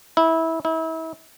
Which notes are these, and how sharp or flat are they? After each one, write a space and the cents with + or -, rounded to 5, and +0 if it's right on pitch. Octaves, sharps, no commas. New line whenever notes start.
E4 -20
E4 -35